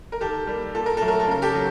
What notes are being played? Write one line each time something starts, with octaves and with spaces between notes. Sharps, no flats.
A#4
D#3 G4 A4
G3 A#3
A#2 A4
A#4
F#3 A3 A4
A#4
A4
C#3 A#4
G4 A4
F#3